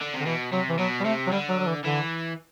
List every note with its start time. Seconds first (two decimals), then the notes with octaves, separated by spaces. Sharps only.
0.01 D3
0.14 C3
0.20 D3
0.26 B2 E3
0.52 C3 F#3
0.69 E3
0.78 B2 F#3
1.00 G3
1.05 C3 A3
1.27 F#3
1.32 D3 G3
1.49 F#3
1.59 F#3
1.67 E3
1.84 D3 E3